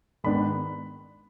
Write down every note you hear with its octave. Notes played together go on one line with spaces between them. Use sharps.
G#2 D#3 B3 D4 B5